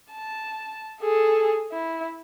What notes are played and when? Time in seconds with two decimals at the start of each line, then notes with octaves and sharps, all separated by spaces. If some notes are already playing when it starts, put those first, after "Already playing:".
0.11 A5
1.01 G#4 A4
1.72 E4